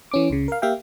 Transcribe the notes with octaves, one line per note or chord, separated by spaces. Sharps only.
E3 C#4 D6
C#2 C#3
A#4 F5
A#3 G4 E5 F5 G5